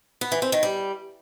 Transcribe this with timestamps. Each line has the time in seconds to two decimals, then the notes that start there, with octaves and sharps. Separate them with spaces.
0.21 B3
0.32 E3
0.42 C4
0.52 D#3
0.63 G3